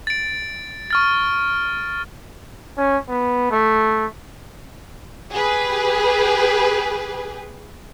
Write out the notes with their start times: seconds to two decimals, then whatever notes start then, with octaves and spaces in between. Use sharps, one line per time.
0.07 A6 D7
0.91 C#6 F6 A6
2.77 C#4
3.09 B3
3.51 A3
5.32 G4 G#4 B4